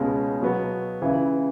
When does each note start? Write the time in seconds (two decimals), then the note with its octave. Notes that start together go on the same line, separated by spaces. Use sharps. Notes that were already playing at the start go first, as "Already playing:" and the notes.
Already playing: C#2 B2 G#3 C#4
0.41 B2 F#3 B3 F#4
1.01 C#2 C#3 E3